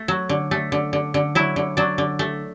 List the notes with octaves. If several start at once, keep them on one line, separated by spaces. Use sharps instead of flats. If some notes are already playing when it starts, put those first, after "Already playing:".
Already playing: A3
F#3
D3
A3
D3
D3
D3
F#3 E4
D3
F#3 D4
D3
A3